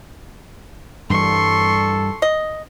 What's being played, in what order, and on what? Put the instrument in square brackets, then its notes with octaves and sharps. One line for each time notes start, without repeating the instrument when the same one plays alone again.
[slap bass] G2 E3 G3 [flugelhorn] A4 [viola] C6 C#6
[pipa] D#5